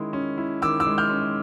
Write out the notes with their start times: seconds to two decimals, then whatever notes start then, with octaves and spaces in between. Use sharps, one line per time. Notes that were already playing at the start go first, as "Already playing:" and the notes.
Already playing: D#3 G#3 C#4 E4 D#6
0.13 C#4
0.38 E4
0.62 D#3 D6 E6
0.80 D6 E6
0.87 G#3
0.98 F6 G6
1.10 C#4